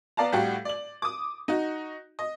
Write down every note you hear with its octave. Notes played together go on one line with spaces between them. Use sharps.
B3 D5 F5 A5 A#5
A2 G3 F#4 G4 F5 F#5
D5 F#7
D6 D#6
D#4 F#4
D#5